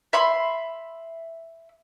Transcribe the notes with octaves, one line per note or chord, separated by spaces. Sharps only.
E5 B5 C6